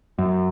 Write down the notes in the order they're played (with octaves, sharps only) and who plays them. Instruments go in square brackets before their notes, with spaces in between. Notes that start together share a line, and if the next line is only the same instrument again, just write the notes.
[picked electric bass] F#2